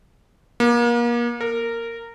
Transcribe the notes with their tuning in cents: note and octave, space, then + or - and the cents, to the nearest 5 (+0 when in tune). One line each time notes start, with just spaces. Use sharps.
A#3 +35
A#4 -15